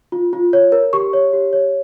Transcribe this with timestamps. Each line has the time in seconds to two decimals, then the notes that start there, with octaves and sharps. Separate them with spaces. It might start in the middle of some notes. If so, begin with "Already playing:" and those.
0.12 F4
0.33 F4
0.53 C#5
0.72 A#4
0.93 G4 C#6
1.13 C#5
1.33 G4
1.53 C#5